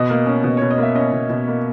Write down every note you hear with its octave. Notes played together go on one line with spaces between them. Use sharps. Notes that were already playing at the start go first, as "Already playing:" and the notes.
Already playing: B2 D#5
A#3
C#4
B2
B2 C#5
D#5
A#3 E5
C#4 D#5
B2
B2
A#3